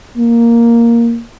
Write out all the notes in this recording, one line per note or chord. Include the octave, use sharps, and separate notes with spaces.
A#3